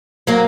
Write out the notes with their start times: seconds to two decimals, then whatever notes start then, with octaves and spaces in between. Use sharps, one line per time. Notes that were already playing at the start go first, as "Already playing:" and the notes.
0.27 F#3 A#3